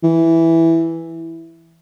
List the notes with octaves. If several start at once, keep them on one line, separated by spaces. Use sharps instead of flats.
E3